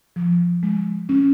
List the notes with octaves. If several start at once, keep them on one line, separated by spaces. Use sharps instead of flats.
F3
G#3
C#4